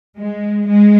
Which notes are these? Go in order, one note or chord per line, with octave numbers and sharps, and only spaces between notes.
G#3
G#3